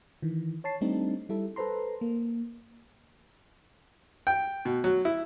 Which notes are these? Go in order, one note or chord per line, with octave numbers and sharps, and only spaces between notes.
D#3 E3
C#5 A5 C7
G3 A3 C4 D4 D#4
G3 E4 A4
A4 B4 C5 A#5 C6
A#3
G5
B2
F#3
E4